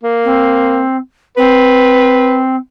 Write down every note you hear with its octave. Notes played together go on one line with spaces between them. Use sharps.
A#3
C4
C4 B4